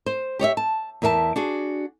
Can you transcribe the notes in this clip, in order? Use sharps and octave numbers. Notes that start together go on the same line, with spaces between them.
C5
G4 C#5 D5 E5
A5
E2 A#4 E5 F5 A5
D4 F#4 G#4